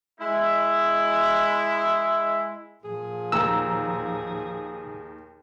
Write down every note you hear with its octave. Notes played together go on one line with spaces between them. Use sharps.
G#3 E4
A#2 F3 G#4
D#2 A#5 E6